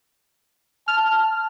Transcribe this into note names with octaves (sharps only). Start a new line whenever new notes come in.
A5 F6